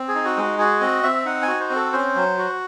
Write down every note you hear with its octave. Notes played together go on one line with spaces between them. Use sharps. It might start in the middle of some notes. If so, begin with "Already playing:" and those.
Already playing: C4
G#4
D#4
F#4
G#3 F#4
F#4 G#4
C4 D#5
C4 E5
D#4 F#5
G#5
F#4
C5
C4
A4
C#4 C5
F#3
F#4